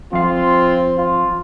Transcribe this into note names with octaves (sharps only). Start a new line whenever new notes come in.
F2 C4 F4 F5
F4